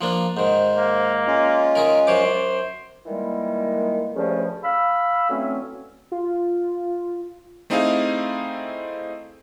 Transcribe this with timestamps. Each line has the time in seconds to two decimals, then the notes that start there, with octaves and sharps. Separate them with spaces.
0.01 F3 A#3 D4
0.37 G#2 D#3 C5
0.77 A#3
1.27 G#3 C#4 F4
1.75 D#3 G#4 A#4
2.07 F#2 C5 C#5 D6
3.06 A#2 D#3 E3 G3 G#3 A#3
4.15 D2 G2 C#3 F3 A3 C#4
4.63 F5 B5 E6
5.30 D3 E3 F#3 A3 C4 C#4
6.12 F4
7.70 A3 C4 D#4 E4 G#4 F5